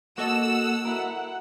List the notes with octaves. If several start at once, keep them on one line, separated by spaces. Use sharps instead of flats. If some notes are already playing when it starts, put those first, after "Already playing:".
A#3 F#4 A4 D#5 F#5 E6
E4 A#4 F#5